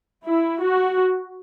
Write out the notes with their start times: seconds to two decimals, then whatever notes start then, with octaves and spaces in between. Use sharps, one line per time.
0.25 E4
0.62 F#4